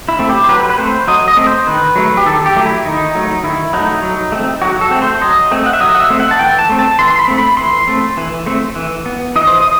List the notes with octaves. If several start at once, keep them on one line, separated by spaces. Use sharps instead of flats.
E4
A3 C4
G4
C5
F#3 B4
B4
A3 C4 C5
F#3 D#5
D#5
A3 C4
C5
D#3 B4
F#3 A3
G4
D#3 A4
G4
F#3 A3
E4
D#3 D#4
F#3 A3
D#3 E4
F#3 A3 D#4
F#3
A3 C4
F#3 F#4
A4
A3 C4
C5
F#3 D#5
A3 C4
F#5
E5
F#3 D#5
F#5
E5
A3 C4
F#5
A5
E3 G5
A5
A3 C4
A5
E3 C6
C6
B5
A3 C4
B5
E3 C6
A3 C4
E3
A3 C4
E3
B3
E3 D#5
C5
D#5